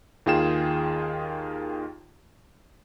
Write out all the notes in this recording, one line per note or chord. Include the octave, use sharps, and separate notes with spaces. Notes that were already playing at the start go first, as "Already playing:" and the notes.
D#2 D#3 F4 G#4 G5 E7